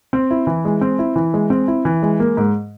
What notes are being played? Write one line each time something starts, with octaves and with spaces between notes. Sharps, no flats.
C4
E4
E3
G#3
C4
E4
E3
G#3
C4
E4
E3
G#3
A#3
G#2